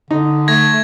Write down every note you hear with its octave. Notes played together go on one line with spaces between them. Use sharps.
D3 D#4
A3 G#6 A#6